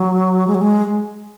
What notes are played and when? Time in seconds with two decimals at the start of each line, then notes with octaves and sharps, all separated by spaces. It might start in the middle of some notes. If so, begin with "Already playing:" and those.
Already playing: F#3
0.47 G#3
0.55 F#3
0.61 G#3